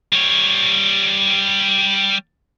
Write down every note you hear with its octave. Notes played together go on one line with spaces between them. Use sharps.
G3 C#5